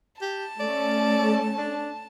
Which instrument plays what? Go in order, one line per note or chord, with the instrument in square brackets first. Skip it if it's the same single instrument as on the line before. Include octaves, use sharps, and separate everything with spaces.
[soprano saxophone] G4 [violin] A5
[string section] A3 C#4 [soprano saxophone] D5
[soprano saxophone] D4